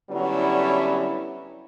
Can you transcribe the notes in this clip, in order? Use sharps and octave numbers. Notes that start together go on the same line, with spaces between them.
D3 F#3 G3 B3 C#4 E4